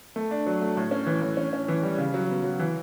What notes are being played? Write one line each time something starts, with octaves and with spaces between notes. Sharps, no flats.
A3
D4
F#3
A3
A2
C#4
E3
A2
C#4
C#4
E3
G3
C#3
F#3
B3
F#3
E3